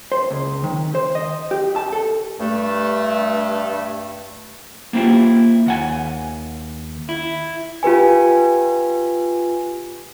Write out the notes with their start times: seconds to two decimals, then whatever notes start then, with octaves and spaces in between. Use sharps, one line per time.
0.12 C5
0.31 C#2
0.64 D#3
0.95 C5
1.15 D#5
1.51 G4
1.76 A5
1.92 A4
2.39 G2 A3
4.93 A#3 C4 E4 F4 G4
5.66 D#2 F#5 G#5
7.09 E4
7.83 F4 G4 B4 G#5